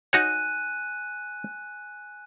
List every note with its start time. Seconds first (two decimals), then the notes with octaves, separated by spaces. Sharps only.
0.13 D#4 F#4 C#5 G#5 F#6 D#7